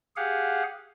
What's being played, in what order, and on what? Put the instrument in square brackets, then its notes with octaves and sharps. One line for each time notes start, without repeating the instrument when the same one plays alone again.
[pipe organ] G4 G#4 F5 F#5